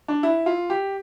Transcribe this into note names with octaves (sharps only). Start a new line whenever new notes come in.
D4
E4
F4
G4